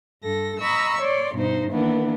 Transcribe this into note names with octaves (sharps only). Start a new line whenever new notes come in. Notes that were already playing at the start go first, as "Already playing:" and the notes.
G2 A4 A#6
D#5 A#5 B5 C#6 E6
C#5 D5 C6
G2 B2 D#4 C5
D#3 E3 A#3 B3 D4